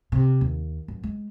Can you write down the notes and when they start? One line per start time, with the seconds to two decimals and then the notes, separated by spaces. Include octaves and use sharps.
0.12 C3
0.41 D#2
0.88 F#2
1.04 G#3